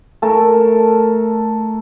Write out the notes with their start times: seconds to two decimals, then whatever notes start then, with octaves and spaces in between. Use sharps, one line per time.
0.22 A3 A4 A#4